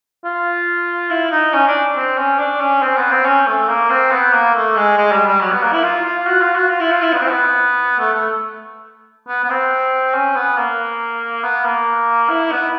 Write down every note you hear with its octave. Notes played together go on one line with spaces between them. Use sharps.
F4
E4
D#4
C#4
D4
C4
C#4
D4
C#4
C4
B3
C4
C#4
A3
A#3
C4
B3
A#3
A3
G#3
G#3
G3
G3
F#3
B3
A#3
E4
F4
F4
F#4
F4
F#4
F4
E4
F4
E4
B3
C4
B3
A3
A3
B3
B3
C4
C#4
B3
A#3
B3
A#3
E4
B3